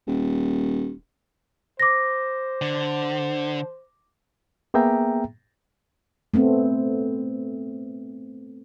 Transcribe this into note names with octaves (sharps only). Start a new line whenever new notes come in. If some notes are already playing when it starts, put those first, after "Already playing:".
D#1
C5 D6 A#6
D3
A#3 B3 G#4 E5 G5 A#5
A3 B3 C4